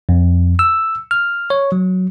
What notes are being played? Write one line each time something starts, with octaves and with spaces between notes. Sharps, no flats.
F2
E6
F6
C#5
F#3